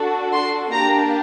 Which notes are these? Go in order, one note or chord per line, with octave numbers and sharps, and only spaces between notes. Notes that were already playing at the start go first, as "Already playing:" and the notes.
Already playing: D4 F#4 A4
C6
A#3 D4 G4 A#5